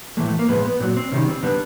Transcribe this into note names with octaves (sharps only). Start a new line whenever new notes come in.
A2 E3 G#3 A3
A3
A#3
A2 F3 G#3 B3
B3
A#2 F#3 C4
C4
C3 D#3 G3 C#4
C4
D3 G3 B3